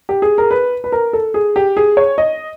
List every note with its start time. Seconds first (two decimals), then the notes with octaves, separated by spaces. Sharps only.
0.09 G4
0.22 G#4
0.38 A#4
0.51 B4
0.84 B4
0.92 A#4
1.13 A4
1.34 G#4
1.56 G4
1.77 G#4
1.97 C#5
2.18 D#5